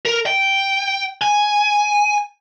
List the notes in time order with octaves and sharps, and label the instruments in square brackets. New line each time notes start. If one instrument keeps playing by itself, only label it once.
[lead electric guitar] A#4
G5
G#5